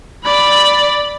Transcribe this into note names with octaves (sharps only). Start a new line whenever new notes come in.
D5 B5